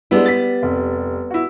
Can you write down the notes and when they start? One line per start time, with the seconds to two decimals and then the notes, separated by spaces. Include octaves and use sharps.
0.11 G3 G#3 B3 D4 E4
0.26 A6 B6
0.63 F1
1.31 E4 F#4